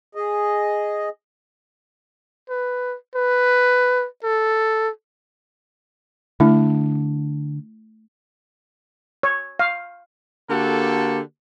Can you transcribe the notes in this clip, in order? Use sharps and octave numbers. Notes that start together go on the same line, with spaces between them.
G#4 D#5
B4
B4
A4
D3 A3 D4 E4
C#5
F5
D3 A#3 F#4 G4 A4